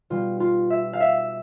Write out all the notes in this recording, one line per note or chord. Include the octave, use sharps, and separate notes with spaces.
B2 G3 F4
F4
E5
F5
E5